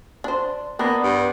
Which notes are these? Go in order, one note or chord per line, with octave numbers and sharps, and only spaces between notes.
D4 C5
A#3 B3 D4
G2